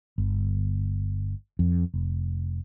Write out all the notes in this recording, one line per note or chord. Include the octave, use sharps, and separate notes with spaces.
G1
F2
F1